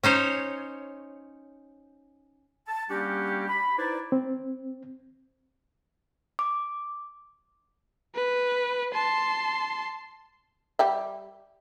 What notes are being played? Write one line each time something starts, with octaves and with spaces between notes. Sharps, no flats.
C#4 D#4 C5 C#5
A5
G3 A#3 C#4 D4 F#4 G4
B5
D#4 E4 B4 C5 D5
C4
D6
B4
A5 C6
G3 G4 E5